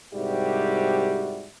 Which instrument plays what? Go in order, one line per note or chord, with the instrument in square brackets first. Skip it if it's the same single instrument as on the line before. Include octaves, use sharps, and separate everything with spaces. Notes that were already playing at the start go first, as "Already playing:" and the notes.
[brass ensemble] C2 G#2 G3 F#4 G4 E5